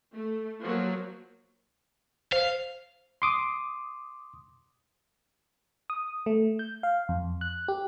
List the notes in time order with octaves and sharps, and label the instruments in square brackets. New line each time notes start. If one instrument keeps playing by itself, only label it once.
[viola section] A3
F3 F#3 A#3 F#4
[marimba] C5 [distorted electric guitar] F5
[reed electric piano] C6 D6 D#6
[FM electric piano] D#6
A3
G6
F5
F2
F#6
G4